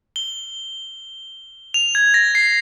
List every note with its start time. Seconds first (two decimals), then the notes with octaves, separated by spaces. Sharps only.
0.16 G7
1.74 F7
1.95 G#6
2.14 A#6
2.35 C7